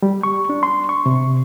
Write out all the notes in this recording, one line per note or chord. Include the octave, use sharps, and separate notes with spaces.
G3
C#6
D4
C6
C#6
C3